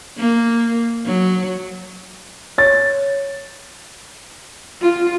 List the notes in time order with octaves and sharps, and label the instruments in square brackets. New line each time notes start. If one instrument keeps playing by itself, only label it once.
[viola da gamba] A#3
F#3
[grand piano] C#5 A6
[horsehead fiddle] F4